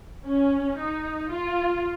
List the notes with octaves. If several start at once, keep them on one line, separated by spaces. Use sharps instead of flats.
C#4
D#4
F4